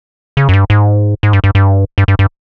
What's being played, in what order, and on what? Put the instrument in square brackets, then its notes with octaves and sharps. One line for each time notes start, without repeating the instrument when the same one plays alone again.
[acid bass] C#3
F#2
G2
G#2
G#2
G2
G2
G2
G2
G2
G2